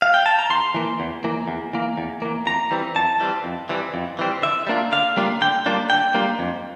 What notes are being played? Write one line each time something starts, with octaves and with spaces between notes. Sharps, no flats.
F5
G5
A5
A#5
E2 C6
E3 A#3
E2
E3 A#3
E2
E3 A#3
E2
E3 A#3
F2 A#5
E3 G3 C4
F2 A5
E3 G3 C4
F2
E3 G3 C4
F2
E3 G3 C4
D3 E5
G3 A#3 D4 F4
D3 F5
G3 A#3 D4 F4
D3 G5
G3 A#3 D4 F4
D3 G5
G3 A#3 D4 F4
F2